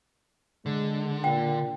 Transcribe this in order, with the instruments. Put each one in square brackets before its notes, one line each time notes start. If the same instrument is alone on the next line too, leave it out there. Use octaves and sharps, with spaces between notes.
[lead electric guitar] D3 [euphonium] G#3
[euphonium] A#2 [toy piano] G5